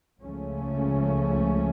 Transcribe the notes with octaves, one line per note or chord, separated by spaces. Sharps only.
C#2 C#3 F3 A3 C#4